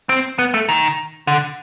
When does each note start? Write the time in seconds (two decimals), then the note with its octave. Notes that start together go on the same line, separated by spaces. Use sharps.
0.09 C4
0.39 B3
0.54 A3
0.69 D#3
1.27 D3